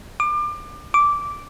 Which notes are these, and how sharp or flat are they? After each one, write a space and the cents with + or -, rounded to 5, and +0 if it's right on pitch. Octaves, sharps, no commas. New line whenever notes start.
D6 +30
D6 -10